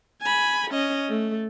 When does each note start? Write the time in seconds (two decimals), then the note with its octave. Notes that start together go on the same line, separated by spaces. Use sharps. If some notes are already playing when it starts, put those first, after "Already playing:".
0.22 G#5 B5
0.70 C#4 D#5
1.09 A3